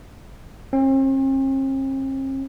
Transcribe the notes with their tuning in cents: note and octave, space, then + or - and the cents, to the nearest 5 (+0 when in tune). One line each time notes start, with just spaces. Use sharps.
C4 +45